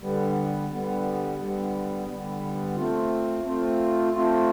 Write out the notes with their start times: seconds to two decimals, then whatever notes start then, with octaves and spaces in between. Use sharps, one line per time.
0.01 D3 G3 B3
0.70 D3 G3 B3
1.39 D3 G3 B3
2.07 D3 G3 B3
2.75 A3 C4 F4
3.43 A3 C4 F4
4.13 A3 C4 F4